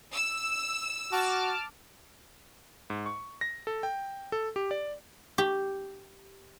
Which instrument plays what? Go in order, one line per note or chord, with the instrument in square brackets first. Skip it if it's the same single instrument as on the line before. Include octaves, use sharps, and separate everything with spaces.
[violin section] E6
[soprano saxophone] F#4 [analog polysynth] A5 D6 F6
[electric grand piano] G#2
C#6
A#6
A4
G5
A4
G4
D5
[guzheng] G4